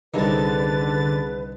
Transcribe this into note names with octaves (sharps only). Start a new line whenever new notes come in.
C2 D3 D#3 C#4 G#4 B4 A5 A6